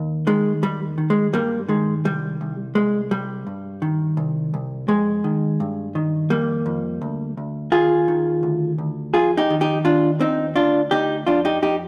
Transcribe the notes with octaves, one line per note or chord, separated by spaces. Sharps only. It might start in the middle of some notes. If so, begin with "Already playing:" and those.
Already playing: D#2
D#3 G#3
D#2 G3
D#3
G#3
G2 G3 A#3
D#3 G#3
C2 G3
C2
C2 G#3
C2 G3
G2
D#3
C2
C2
F2 G#3
D#3
G2
D#3
F2 G3 A#3
F2
D2
D2
D#2 F4 G#4
D#3
D2
D2
F2 F4 G#4
D#4 G4
D#3
D#4 G4
D#2 D4 F4
D#2 C4 D#4
D2 D4 F4
D2 D#4 G4
F2 D4 F4
D#4 G4
F2 D#4 G4